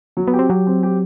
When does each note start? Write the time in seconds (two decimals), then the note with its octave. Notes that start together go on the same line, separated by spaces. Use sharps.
0.17 F#3
0.28 B3
0.34 G4
0.39 C4
0.49 F#3 G4
0.67 C4
0.83 G4